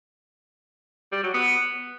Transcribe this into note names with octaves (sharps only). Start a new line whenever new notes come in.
G3
F#3
B3